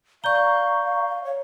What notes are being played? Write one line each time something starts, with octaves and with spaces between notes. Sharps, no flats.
D5 F5 A#5 C#6 G6 G7
C#5